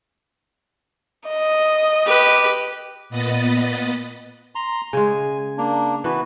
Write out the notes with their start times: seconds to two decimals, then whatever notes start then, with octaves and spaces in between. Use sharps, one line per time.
1.28 D#5
2.06 G4 B4
3.09 A#2 B3 D#5 B5 D#6 A6
4.55 A#5 C6
4.93 C#3 G#3 G#5
5.58 A#3 D4
6.04 E3 B3 F#4 B4